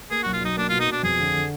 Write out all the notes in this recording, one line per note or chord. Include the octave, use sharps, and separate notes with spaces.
A#3 G#4
B1 F#4
F4
B1 D#4
A#3 D4
B2 F4
D#4
B2 D4
F2 G#4
D3
D3